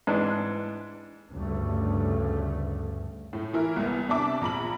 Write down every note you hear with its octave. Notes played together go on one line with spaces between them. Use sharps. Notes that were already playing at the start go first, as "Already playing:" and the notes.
G#2 E3 D4 A5
D2 G2 C#3 A3
A2
E3 E4 A#4
C2 B3
C3 D4 E5 A5 D6
A#1 A#5 B5 F#7